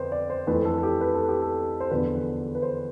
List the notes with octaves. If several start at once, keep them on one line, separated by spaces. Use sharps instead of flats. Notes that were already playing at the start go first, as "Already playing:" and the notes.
Already playing: F2 D3 B4 C5
D5
C5
F2 E3 A3 B4
A4
A4
G4
B4
A4
G4
A4
C5
E2 D3 F3 B4
B4
C5